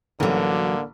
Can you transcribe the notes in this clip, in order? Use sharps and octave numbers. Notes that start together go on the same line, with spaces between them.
A1 D3 E3 F#3 A#3